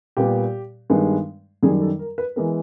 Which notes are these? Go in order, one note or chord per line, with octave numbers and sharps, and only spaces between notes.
A#2 G3 B3 G4
G2 D#3 G#3 B3
F#2 D#3 G3 G#4
A4
A#4
B4
E3 G#3 B3 A#4